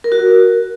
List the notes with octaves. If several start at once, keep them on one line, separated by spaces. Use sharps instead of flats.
A#4
F#4
A#4